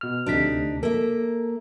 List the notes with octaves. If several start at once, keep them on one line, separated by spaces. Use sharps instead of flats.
B2 F6
D2 C3 D4 D#4 B6
A#3 A4 E5